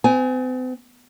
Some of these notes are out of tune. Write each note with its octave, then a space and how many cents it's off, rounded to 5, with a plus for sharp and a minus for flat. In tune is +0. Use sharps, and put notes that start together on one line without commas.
C4 -45 G#5 +0